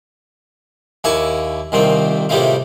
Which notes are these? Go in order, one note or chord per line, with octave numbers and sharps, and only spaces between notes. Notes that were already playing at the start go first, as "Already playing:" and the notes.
D#2 A#3 E4 G#5 C#6
C2 A#2 D#3 C4
A2 C3 G3 G#3 A#3 F4